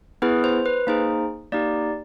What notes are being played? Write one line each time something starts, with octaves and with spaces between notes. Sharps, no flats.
B3 E4 G#4 B4
C5
B4
A#3 D#4 G#4 C5
A#3 D#4 G4 D5